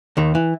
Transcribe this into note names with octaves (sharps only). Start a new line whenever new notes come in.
D#2 D#3
E3